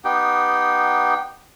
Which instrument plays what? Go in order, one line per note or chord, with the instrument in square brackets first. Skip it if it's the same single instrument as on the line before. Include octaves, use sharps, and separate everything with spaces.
[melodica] B3 D#4 G4 G5